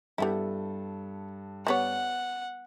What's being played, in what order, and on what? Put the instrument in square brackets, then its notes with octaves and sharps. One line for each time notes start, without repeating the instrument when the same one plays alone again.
[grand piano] G2 A4 [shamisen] G3 B3 E4
[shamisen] G3 B3 C#5 [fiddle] F#5